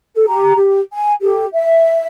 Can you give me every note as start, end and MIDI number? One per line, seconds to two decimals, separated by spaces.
0.15 0.25 69
0.28 0.55 67
0.28 0.55 82
0.55 0.79 67
0.93 1.13 80
1.21 1.45 67
1.21 1.45 69
1.53 2.07 76